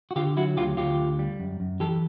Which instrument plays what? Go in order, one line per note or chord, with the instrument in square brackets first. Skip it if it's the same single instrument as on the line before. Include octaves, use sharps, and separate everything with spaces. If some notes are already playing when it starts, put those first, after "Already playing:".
[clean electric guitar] F#4
D3 F4 G4
F#3 E4 F#4
D2 F4 G4
D2 F4 G4
D3
G3
F#2
F#2
E3 G4 A4